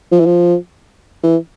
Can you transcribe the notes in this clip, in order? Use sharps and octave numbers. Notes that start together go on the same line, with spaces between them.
F3
E3
F3
E3